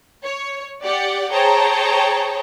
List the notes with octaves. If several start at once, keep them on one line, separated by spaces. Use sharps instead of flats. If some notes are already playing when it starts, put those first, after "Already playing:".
C#5
G4 D5 F#5
G#4 C5 C#5 G5 A5 A#5